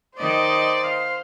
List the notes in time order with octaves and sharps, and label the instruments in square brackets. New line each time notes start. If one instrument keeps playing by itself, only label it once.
[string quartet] D#3 D#5 [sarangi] C5 [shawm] D5
[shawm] F5